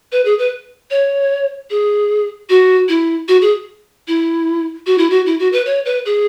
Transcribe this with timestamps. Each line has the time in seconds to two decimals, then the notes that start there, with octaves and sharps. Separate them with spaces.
0.12 B4
0.25 G#4
0.39 B4
0.91 C#5
1.70 G#4
2.49 F#4
2.88 E4
3.28 F#4
3.42 G#4
4.08 E4
4.86 F#4
4.98 E4
5.10 F#4
5.26 E4
5.39 F#4
5.52 B4
5.66 C#5
5.85 B4
6.05 G#4